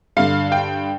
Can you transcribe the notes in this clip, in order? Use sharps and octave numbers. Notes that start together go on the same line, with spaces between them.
G2 D3 F5
G5